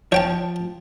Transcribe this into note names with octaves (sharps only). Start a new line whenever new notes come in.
F3 C#5 G5 A5